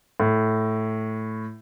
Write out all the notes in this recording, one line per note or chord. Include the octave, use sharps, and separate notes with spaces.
A2